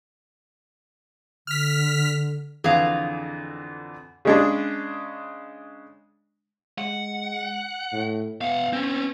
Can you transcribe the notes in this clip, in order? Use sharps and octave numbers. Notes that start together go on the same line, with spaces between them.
D3 F6 B6
F2 D3 E3 G#4 F5
C#3 G#3 D4
G#3 F#5
A2
B3 F5 F#5
C4 C#4